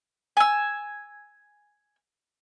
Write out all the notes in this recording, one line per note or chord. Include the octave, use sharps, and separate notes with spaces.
G#5 E6